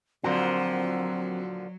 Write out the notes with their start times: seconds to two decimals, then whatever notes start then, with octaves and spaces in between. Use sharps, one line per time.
0.24 A#2 D3 F3 F#3 C4 F#4 A#4 C5